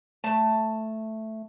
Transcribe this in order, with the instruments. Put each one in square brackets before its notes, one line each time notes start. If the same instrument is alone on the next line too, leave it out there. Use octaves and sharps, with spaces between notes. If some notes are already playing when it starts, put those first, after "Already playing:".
[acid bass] A3 [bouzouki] A5